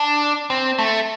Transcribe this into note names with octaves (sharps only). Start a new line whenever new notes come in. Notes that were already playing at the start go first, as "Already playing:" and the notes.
Already playing: D4
C4
A3